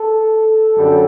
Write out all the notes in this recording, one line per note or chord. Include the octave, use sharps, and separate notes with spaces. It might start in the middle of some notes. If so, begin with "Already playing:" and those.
Already playing: A4
F#2 D3 G3